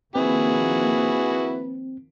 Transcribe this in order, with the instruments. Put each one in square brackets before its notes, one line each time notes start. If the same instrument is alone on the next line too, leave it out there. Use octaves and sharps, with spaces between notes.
[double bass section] D#3 F3 A#3 [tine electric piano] C4 [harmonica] E4 F#4 G#4 [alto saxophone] B4